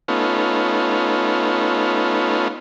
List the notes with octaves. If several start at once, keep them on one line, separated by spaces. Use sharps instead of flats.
A3 B3 C#4 D#4 F4